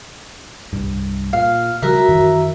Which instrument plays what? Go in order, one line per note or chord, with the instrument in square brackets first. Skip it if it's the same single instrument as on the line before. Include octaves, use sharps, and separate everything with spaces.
[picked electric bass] C2 G2
[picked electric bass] A#2 [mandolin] F5
[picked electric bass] C#3 F3 G3 [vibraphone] F#4 A#4 A#5 [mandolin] E5
[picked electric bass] F#2 D#3 E3